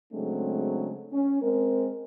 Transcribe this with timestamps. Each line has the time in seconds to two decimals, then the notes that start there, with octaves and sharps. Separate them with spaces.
0.13 C#3 F#3 G#3 A3 C4 D4
1.13 C#4
1.42 G#3 C4 A#4